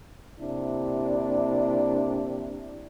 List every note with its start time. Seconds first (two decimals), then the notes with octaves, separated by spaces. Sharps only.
0.40 C3 A#3 D4 E4